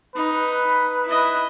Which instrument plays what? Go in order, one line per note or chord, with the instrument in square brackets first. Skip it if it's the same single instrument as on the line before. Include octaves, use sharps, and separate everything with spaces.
[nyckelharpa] D#4 [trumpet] B4
[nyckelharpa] E4 D#5